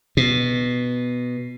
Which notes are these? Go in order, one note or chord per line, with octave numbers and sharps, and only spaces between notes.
B2